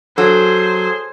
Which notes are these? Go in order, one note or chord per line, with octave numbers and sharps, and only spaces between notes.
F#3 G#4 A4 C5